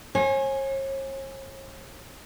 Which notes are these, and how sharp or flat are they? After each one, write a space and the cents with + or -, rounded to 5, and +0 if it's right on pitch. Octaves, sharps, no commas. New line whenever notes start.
C#5 -45 G#5 +0